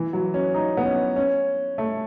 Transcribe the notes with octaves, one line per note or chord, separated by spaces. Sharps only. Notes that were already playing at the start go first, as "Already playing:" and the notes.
Already playing: E3
F#3
C#4
D#4
B3
C#4
C#4
A3